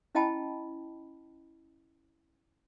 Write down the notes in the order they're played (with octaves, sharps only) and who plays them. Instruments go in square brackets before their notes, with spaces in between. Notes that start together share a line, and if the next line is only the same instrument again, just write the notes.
[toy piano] C#4 E4 D#5 G5 A5 B5